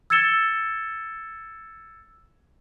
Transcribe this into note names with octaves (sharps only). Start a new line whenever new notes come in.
E6 G#6 A6 C#7 E7 G7